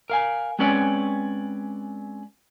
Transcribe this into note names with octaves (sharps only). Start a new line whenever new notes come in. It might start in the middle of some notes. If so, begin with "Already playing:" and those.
A#4 F5 G#5
G#3 C4 C#4 B4 C#5 D5